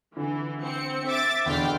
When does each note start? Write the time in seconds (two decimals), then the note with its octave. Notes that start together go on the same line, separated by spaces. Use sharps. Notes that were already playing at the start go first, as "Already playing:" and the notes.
0.17 D3 E3
0.61 C4 C#7
1.07 E5 D6 A6
1.46 E2 B2 D3 G5 C6 F6